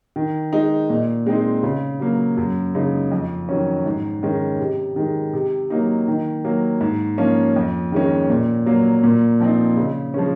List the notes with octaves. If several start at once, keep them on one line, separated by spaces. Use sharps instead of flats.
D#3
G#3 D#4
A#2
G#3 C4 D#4
C#3
F#3 A#3
F#2
C#3 G#3 D#4
F2
D#3 F#3 C#4
G#2
D#3 G#3 C#4
C3
D#3 G#3
C3
F#3 A#3 D#4
D#3
F#3 A#3
G#2
F3 A#3 C#4
F2
D#3 G#3 C#4
A#2
F#3 A#3
A#2
F3 C4 D#4
C#3
F3 G#3 C#4